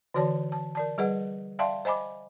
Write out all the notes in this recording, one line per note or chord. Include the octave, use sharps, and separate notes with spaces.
D3 E3 F#4 C#5 D5 A5
A5
A#4 D5 A5
G3 G#4 B4 D#5 F#5
D5 E5 F5 G5 A5 C6
C5 D#5 G#5 B5 D6